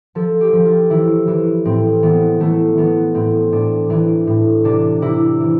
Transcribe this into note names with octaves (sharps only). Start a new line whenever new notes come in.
F3 A4
G4
F3
F4
E3 E4
E3
A2 C4
E3 B3
E3 A3
E3 B3
A2 C4
A2 D4
E3 D4
A2
C3 D4
C3 E4
E3